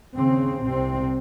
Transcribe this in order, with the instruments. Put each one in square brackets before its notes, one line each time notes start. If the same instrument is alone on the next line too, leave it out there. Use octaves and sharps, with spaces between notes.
[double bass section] D#2 C#3 C4
C2 C3 C4